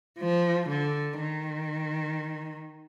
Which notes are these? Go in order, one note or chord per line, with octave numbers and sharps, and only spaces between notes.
F3
D3
D#3